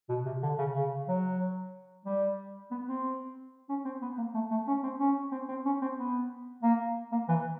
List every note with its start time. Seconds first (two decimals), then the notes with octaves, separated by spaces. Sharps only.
0.09 B2
0.26 C3
0.43 D3
0.58 C#3
0.75 C#3
1.08 F#3
2.06 G3
2.71 B3
2.88 C4
3.69 C#4
3.85 C4
4.02 B3
4.18 A#3
4.34 A3
4.51 A3
4.68 C#4
4.83 C4
5.00 C#4
5.32 C4
5.49 C4
5.66 C#4
5.81 C4
5.98 B3
6.63 A#3
7.12 A#3
7.29 E3